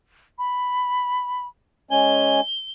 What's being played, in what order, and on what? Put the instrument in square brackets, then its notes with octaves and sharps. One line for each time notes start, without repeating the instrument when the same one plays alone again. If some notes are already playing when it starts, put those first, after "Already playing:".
[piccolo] B5
[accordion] G#3 C#4 G#5 [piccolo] G7